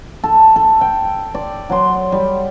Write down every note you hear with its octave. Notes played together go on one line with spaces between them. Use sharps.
A4
A4
G5
D5
F#3 C6
G3